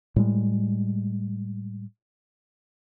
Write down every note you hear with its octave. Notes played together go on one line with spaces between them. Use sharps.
A2 G3 G#3